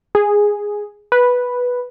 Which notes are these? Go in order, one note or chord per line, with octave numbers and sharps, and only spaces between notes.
G#4
B4